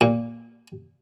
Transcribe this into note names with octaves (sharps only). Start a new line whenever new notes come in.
A#2